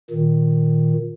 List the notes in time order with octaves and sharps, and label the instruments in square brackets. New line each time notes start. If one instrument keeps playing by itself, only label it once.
[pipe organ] A#2 D#3